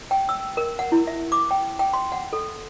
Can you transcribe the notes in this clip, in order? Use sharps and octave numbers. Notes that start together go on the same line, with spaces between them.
G5
E6
A#4
F#5
E4
E5
D6
G5
G5
C6
F#5
A4